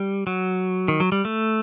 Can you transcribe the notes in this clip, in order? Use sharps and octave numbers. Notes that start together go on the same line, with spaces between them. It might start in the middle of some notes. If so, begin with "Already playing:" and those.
Already playing: G3
F#3
D#3
F#3
G3
A3